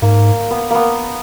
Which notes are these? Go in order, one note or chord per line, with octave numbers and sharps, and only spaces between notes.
G#2 A#3
B3
A#3 B3